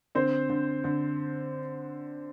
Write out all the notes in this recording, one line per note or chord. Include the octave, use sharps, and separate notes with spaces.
D3 C4 C5
D3
D3